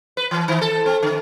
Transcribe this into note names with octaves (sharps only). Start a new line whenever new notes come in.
B4
E3
D#3
A4
C4
D3